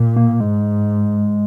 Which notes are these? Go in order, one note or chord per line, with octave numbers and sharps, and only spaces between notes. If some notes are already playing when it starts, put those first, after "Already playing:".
Already playing: A#2
A#3
G#2 G#3